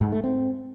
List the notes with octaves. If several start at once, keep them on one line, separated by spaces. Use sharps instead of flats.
G#2
A3
C4